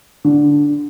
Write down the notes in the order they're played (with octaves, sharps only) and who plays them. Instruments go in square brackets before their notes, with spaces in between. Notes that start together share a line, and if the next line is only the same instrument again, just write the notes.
[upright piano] D3